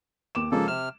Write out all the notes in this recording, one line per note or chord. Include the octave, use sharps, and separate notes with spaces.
D#2 D6 E7
C#3 F3 G#3 A#3 A4
C3 F6 E7